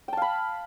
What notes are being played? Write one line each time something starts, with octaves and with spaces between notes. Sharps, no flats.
F5 G5 A5 B5